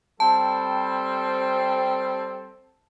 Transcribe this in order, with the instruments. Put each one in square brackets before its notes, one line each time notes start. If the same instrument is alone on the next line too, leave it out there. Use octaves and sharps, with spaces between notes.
[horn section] G3 C4 A4 [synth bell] A5